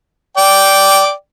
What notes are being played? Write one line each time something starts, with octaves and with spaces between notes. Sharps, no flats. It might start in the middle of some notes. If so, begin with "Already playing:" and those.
D5 G5